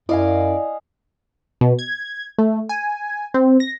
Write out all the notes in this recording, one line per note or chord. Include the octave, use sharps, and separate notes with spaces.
F#2 E4 D5 D#5 F5 G#5
B2
G#6
A3
G#5
C4
A#6